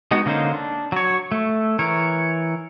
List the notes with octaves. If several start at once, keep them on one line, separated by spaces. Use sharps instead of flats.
G#3 B3 D#4 F#4
D3 A#3 C#4 D#4 C5
D4
F#3 C#5
A3
E3 A#4 C#5